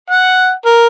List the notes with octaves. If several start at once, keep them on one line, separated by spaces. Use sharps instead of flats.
F#5
A#4